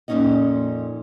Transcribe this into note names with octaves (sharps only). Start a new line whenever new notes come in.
F2 A#2 A#3 C#4 D#4 D#5